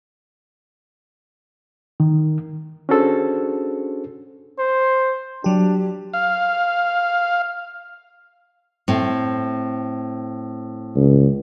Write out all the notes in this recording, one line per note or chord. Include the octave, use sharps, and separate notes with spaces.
D#3
C#4 D4 F#4 G#4 A4 C5
C5
F#3 D4 G4
F5
A2 C4
C#2